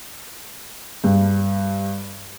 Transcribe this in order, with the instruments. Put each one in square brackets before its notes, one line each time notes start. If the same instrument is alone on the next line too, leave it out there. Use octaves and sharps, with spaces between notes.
[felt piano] G2